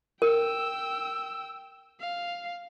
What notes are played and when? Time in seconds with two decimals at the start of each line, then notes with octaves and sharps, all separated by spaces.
0.22 A#4 G5 E6
2.00 F5